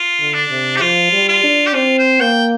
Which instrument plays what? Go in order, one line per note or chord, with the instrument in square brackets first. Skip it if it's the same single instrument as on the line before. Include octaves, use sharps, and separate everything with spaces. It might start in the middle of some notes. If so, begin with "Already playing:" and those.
Already playing: [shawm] F4
[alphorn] D3
[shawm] D4
[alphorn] C3
[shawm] G4
[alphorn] F3 [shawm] F4
[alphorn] G3
[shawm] F4
[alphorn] D4
[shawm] G4
[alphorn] C4 [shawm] F4
[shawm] C5
[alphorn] A#3 [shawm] G5